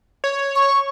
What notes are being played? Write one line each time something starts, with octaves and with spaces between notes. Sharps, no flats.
C#5
C#6